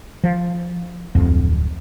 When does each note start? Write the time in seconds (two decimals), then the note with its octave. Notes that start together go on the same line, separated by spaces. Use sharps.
0.24 F3
1.15 D1 F2